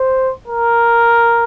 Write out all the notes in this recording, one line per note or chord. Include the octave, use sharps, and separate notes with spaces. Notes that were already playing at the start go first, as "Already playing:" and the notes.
Already playing: C5
A#4